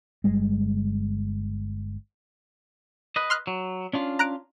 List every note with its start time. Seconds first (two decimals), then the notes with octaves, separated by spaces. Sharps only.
0.24 G1 G3 G#3
3.16 B4 D#5
3.30 C6 F6 F#6
3.47 F#3
3.93 C#4 D4 F4
4.19 A#5 F#6 D7